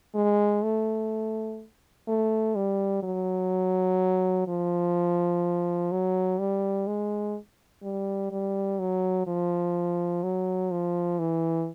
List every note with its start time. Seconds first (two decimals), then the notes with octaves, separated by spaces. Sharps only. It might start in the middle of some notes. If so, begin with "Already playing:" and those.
0.15 G#3
0.64 A3
2.08 A3
2.55 G3
3.03 F#3
4.47 F3
5.92 F#3
6.39 G3
6.87 G#3
7.83 G3
8.31 G3
8.80 F#3
9.27 F3
10.23 F#3
10.71 F3
11.19 E3